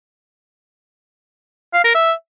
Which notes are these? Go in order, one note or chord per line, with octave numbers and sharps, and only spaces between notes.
F5
A#4
E5